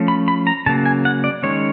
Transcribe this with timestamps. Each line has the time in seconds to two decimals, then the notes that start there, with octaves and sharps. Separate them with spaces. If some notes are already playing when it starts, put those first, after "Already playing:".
Already playing: F3 A3 C#4
0.08 B5
0.28 B5
0.47 A#5
0.66 C#3 F#3 A#3 A5
0.86 G#5
1.05 F#5
1.24 D5
1.43 D#3 G#3 C#4 C#5